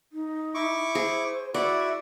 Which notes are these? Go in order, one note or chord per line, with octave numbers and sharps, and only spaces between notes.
D#4
E4 C#6 D6
G#4 C5
E4 F#4 D5 E5 F#5